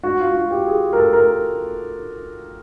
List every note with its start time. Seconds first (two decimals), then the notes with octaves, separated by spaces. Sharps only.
0.03 F#4
0.20 F4
0.35 F#4
0.51 G4
0.67 G#4
0.93 A#4
0.98 A4
1.13 A#4